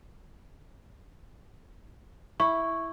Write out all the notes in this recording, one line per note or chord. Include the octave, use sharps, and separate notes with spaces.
E4 C#6